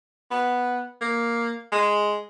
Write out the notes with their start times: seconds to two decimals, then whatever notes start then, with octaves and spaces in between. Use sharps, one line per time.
0.31 B3
1.01 A#3
1.72 G#3